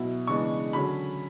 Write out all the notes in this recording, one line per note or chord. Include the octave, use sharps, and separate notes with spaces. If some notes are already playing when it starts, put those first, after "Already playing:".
Already playing: B2 F#3 B3 E4
C#3 E3 G#3 B3 D4 C#6
D3 F#3 C#4 B5